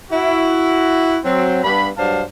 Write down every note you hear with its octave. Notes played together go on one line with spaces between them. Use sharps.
E4 F#4
F#3 C4
G2 B3 B5
G2 F#3 D4 C5 F5 A5